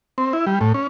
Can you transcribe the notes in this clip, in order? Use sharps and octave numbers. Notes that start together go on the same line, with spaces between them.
C4
E4
G3
A2
C#4